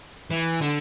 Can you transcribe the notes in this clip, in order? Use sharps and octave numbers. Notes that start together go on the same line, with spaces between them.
E3
D3